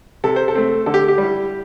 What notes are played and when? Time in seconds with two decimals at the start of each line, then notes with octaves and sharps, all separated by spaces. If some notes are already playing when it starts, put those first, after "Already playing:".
0.24 C3 A4
0.36 C5
0.48 A4
0.55 A3 C4
0.86 D3 A4
0.94 G4
1.08 G4
1.18 G3 E4